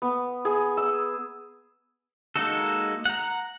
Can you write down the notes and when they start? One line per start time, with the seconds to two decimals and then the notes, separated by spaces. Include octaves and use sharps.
0.02 B3
0.45 G#4
0.77 E6
2.36 G#3 A#3 D#4 F#4 A4
3.05 F#5 A#5